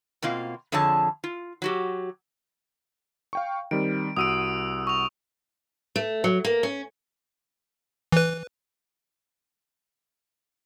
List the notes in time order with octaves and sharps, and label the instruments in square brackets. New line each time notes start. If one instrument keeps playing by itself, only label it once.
[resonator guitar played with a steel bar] B2 A#3 C4 F4
F2 D3 F3 G#4 C#5 A5
F4
F#3 F#4 G4
[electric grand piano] F5 G5 C#6
[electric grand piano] D#3 G3 C4 [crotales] D7
[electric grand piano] C2 F#4 D#7 [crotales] D#6 E6 D7
[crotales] C#6 F7
[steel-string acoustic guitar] A3
F#3
A#3
C#4
[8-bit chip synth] E3 B4